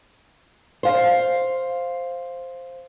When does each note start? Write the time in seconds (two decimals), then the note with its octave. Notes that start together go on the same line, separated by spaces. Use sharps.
0.83 C5 F5